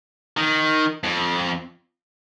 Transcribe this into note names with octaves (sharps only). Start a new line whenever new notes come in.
D#3
F2